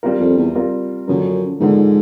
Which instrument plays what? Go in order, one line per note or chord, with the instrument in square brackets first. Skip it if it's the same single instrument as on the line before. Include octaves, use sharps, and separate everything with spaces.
[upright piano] G3 C4 F4 A#4
[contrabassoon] F2
E2
[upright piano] G3 C4 F4 A#4
[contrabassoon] F#2 [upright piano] D3 F3 A#3
[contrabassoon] G#2 [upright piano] D3 F3 A#3